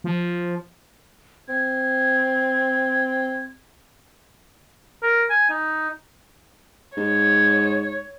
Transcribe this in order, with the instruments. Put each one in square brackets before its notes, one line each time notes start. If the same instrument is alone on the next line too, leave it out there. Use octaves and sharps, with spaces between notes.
[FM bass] F3
[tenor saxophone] C4 [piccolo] G#6
[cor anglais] A#4
G#5
D#4
[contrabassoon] G#2 [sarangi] C#5